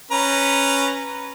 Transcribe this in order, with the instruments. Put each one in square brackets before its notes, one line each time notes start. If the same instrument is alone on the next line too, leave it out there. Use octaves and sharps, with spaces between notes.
[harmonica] C#4 B4 A#5